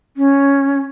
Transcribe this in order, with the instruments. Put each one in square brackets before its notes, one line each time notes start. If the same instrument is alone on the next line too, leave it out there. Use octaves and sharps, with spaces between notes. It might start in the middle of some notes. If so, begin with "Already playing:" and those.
[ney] C#4